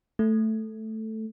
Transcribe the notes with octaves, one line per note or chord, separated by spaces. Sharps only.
A3